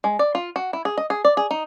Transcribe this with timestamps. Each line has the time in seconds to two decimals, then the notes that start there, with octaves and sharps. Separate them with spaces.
0.04 G#3
0.19 D5
0.35 F4
0.56 F#4
0.73 E4
0.85 G#4
0.98 D#5
1.10 G#4
1.25 D5
1.37 G#4
1.51 D#4